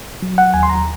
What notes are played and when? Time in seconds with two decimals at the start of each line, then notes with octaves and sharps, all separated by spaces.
0.22 F#3
0.38 F#5
0.54 D#2 G#5
0.63 C6
0.70 A#5